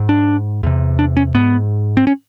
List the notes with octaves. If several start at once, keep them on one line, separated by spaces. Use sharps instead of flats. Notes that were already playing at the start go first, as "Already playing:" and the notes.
Already playing: G#2
D4
E2 C3
D4
C#4
G#2 B3
C4
C#4